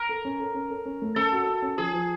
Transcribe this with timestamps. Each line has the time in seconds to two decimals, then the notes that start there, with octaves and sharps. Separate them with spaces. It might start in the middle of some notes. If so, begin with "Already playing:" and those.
Already playing: A#4
0.09 A4
0.25 C#4
0.40 A4
0.54 C#4
0.70 A4
0.85 C#4
1.02 A3
1.16 C#4 A4
1.32 F#4
1.47 F#4
1.62 C#4
1.77 F3 G#4
1.93 F3